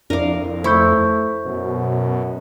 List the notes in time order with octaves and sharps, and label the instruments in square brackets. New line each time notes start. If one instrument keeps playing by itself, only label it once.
[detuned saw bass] F2 [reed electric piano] D4 E4 D5 [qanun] A#4 F5
[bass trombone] A3 [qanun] E4 [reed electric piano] C5 C#6 G6
[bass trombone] F#2 [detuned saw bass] B2